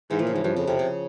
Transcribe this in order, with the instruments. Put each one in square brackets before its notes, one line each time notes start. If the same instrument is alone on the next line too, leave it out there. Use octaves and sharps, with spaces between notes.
[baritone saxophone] G#2 [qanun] E3
[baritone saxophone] A#2 [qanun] F3
[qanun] C#3
[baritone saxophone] G#2 [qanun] E3
[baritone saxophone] G2 [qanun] F3
[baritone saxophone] F2 [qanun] C#3
[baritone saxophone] F2 [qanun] C3
[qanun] C#3